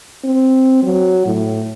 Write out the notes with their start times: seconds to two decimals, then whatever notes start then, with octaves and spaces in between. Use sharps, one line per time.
0.24 C4
0.83 F#3
1.26 A2